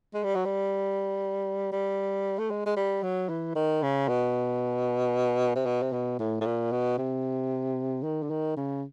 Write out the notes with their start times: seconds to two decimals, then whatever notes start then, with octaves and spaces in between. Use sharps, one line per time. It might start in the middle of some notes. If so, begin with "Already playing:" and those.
0.14 G#3
0.24 G3
0.35 F#3
0.45 G3
1.72 G3
2.39 A3
2.51 G#3
2.66 G#3
2.77 G3
3.03 F#3
3.29 E3
3.56 D#3
3.83 C#3
4.08 B2
5.56 C3
5.66 B2
5.82 C3
5.93 B2
6.19 A2
6.41 A2
6.46 A#2
6.72 B2
6.98 C3
8.03 D#3
8.23 D3
8.30 D#3
8.57 C#3